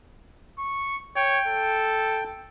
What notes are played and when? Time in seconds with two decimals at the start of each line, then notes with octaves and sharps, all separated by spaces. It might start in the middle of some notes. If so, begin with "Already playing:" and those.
0.59 C#6
1.16 C#5 G5
1.47 A4